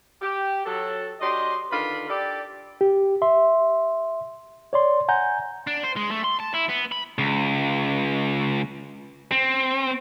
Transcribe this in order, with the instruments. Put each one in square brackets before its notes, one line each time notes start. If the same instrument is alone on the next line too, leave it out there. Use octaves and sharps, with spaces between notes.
[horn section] G4
F#3 A4
F#3 D4 G4 D#5 C6
D3 D#3 F4 B4 B5
G4 A4 D5
[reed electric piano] G4
E5 C6
C#5 D5 C6
F#5 G#5 A#5 G6
[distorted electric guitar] D4
C5
G#3
A3
C6
A5
E4
B3
B5
[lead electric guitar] C#2
C4